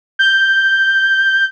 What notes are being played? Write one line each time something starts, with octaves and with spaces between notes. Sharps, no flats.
G6